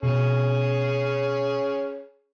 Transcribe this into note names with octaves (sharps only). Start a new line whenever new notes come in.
B2 C#4 G#4